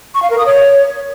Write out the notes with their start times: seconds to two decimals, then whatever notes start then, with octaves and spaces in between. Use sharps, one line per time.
0.15 C#6
0.22 F5
0.30 A#4
0.38 D#6
0.46 C#5